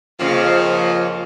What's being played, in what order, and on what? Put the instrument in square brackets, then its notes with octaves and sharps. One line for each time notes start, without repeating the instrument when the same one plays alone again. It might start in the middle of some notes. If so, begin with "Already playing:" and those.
[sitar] F2 C#3 [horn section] F3 A#3